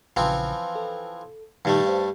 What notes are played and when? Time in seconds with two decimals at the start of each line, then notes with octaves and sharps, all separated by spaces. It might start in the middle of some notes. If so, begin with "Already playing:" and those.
0.16 A#1 C#3 E3 F3 C4
0.75 A4
1.65 G2 A#2 D#3 G3 A3 D#4
1.87 C5 F5